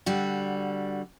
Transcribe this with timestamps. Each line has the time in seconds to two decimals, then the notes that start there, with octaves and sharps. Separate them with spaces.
0.06 D3 G3 F#4